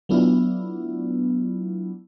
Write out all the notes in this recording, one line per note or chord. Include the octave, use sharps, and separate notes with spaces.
F#3 A3 B3 D4 E4 F4